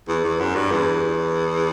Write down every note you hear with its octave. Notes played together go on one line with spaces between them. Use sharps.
E2
E2
F#2
G2
E2